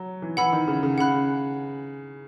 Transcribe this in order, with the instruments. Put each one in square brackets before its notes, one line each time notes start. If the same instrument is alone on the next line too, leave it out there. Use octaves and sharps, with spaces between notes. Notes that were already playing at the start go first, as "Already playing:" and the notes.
Already playing: [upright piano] F#3
E3
[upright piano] E3 [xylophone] F#5 B5 E6
[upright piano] D#3
C#3
C#3
[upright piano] C#3 [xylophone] F#5 B5 F#6